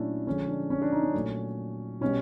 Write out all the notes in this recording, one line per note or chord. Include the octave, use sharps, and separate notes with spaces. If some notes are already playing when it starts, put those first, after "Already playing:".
Already playing: A#2 F#3 A3 C#4 D4 E4
D3 F3 G#3 C#4
D4
C#4
D4
D#4
C#4
A#2 F#3 A3
B2 G3 C#4